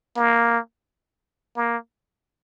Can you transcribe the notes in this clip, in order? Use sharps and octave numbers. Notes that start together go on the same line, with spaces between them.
A#3
A#3